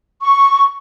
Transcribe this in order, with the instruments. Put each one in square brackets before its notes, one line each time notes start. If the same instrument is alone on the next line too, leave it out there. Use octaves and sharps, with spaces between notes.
[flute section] C#6